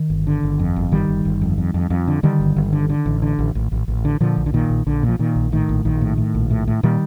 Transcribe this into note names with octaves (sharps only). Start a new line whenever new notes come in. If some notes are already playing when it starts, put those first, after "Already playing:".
Already playing: D#3
G1
D3
G1
F2
G1
G1 D#3 G3
G1
G1
F2
F2
F2
F2
D3
D3 D#3 G3
G1
G1
D3
D3
A1
D3
A1
A1
A1
A1
D3
A#2 D3 F3
A#1
D3
A#2 D#3
A#1
A#1 D3
A#2
F3
A#2 D#3
A#1
A2 D#3
A#1
A#1 D#3
A2
A2
A#1
A2
A2
A#2 D#3 G3